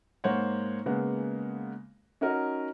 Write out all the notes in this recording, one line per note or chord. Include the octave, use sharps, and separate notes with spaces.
G#2 A#3 C5 C#5 F#5
C#3 G#3 A#3 B3
C#4 D#4 F#4 A#4 D#5